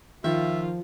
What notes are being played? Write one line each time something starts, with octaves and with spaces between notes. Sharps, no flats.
D#3 F3 F4 E5